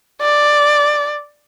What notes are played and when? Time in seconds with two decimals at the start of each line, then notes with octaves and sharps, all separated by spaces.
0.21 D5